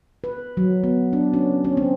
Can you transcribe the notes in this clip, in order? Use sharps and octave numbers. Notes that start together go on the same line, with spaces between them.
B4
F#3
B3
D4
C#4
C#4
C4